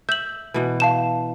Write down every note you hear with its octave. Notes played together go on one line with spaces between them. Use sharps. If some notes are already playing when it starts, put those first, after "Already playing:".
E5 G6 F#7
B2 E3
F5 A5 E7